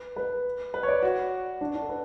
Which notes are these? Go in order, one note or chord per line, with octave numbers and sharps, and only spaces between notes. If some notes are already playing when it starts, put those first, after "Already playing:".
Already playing: B4
B4
B4
C#5
D5
F#4
D4
D4
A4
B4